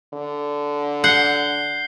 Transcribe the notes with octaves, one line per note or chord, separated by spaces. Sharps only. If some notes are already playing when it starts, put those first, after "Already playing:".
D3
F#5 G6 C7 G7